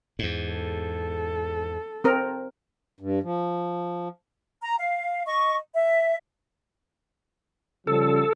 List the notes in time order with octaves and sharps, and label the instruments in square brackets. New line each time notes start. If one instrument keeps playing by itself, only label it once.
[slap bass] E2 G#2
[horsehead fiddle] A4
[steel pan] C4 A#4
[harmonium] G2
F3
[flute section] A#5
F5
D#5 C#6
E5
[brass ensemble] C#3 F3 G3 [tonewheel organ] A4